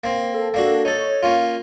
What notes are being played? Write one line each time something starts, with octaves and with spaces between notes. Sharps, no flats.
A#3 C4
A4
A#3 D4 F#4
D#4 A4 C#5
A#3 C#4 F4